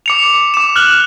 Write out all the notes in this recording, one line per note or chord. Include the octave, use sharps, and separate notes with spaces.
D6 C#7 F7
D6 E7
F6 F#6 F#7